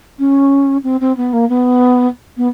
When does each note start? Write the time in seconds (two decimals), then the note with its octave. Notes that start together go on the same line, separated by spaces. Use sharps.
0.19 C#4
0.83 C4
1.01 C4
1.17 B3
1.33 A#3
1.49 B3
2.37 B3